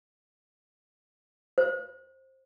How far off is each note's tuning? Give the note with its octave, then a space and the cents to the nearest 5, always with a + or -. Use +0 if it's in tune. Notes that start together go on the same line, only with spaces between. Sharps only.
C5 +15